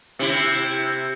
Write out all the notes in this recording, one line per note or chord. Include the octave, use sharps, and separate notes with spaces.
C3 E4